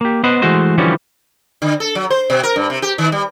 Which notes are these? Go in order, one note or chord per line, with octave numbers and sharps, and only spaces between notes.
A#3 G4
B3 B4 C5 D#5 F#5
E3 G#3 A3 F#4 C5
D3 E3 F3 G3 C#4 F#4
D3
A4
F#3
C5
B2
A#4
G2
C3
G4
D#3
G3